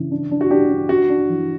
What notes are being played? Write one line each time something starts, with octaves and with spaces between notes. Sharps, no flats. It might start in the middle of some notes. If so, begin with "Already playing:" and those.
Already playing: C#3 E3 D4
D4
D4
F#4
D4 G4
D4
D4 F#4
D4
E3